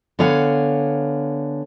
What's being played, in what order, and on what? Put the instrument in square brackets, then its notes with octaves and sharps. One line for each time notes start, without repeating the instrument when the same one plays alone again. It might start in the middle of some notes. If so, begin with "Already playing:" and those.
[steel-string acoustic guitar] D3 B3 C#5 F5 G#5